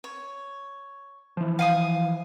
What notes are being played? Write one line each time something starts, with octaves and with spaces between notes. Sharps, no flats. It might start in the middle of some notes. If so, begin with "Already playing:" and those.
C#5
E3 F3
F5 G#5 D#6